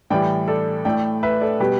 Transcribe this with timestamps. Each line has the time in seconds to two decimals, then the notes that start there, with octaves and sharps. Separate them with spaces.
0.10 A2 E3 G3 D5 G5
0.48 A4 D5
0.85 A2 A3 D5 G5
1.23 B4 E5
1.41 A4 D5
1.60 B2 G3 G4 B4